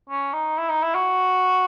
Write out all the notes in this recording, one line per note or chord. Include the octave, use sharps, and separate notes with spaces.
C#4
D#4
E4
D#4
E4
F#4